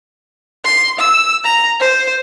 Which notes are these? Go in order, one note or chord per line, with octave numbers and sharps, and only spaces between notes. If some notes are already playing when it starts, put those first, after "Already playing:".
C6
E6
A#5
C5